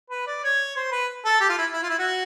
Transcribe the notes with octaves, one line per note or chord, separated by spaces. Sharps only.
B4
D5
C#5
C5
B4
A4
G4
F4
E4
E4
F4
E4
F#4